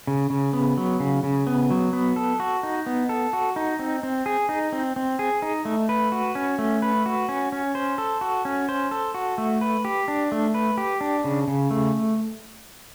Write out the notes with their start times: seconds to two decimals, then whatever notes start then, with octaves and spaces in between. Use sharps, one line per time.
0.07 C#3
0.30 C#3
0.53 B3
0.77 F#3
1.00 C#3
1.23 C#3
1.47 B3
1.71 F#3
1.93 B3
2.16 A4
2.40 F#4
2.63 D#4
2.86 B3
3.09 A4
3.33 F#4
3.56 D#4
3.79 C4
4.03 C4
4.26 G#4
4.49 D#4
4.72 C4
4.96 C4
5.19 G#4
5.42 D#4
5.65 A3
5.89 B4
6.12 F#4
6.35 C#4
6.59 A3
6.82 B4
7.06 F#4
7.29 C#4
7.52 C#4
7.75 C5
7.98 A4
8.21 F#4
8.45 C#4
8.69 C5
8.91 A4
9.14 F#4
9.38 A3
9.61 B4
9.85 G4
10.08 D4
10.32 A3
10.54 B4
10.78 G4
11.01 D4
11.24 C#3
11.48 C#3
11.71 A3